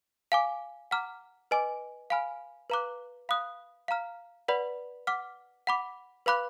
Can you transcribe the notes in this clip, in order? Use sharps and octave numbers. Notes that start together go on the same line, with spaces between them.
F5 G#5 D6
F#5 A#5 D6 F6
B4 D#5 G#5 D6
F5 G#5 B5 F6
B4 F5 A#5 D6 F#6
F5 B5 D#6 F#6
F5 A#5 F6
B4 D5 F#5 B5
F#5 D6 F6
F#5 B5 D6
B4 F5 B5 D6 F#6